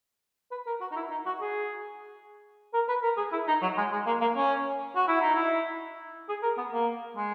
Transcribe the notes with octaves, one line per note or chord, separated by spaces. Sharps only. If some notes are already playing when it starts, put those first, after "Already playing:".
B4
A#4
F#4
D#4
E4
D#4
F#4
G#4
A#4
B4
A#4
G#4
E4
D#4
F#3
G#3
G#3
A#3
A#3
C#4
F#4
E4
D#4
E4
G#4
A#4
B3
A#3
G#3